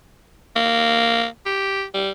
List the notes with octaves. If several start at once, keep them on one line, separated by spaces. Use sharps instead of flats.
A#3
G4
G3